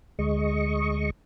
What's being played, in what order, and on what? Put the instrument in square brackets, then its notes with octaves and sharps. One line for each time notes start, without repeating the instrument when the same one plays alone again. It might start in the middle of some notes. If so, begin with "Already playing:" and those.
[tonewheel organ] D2 G#3 D#5 C#6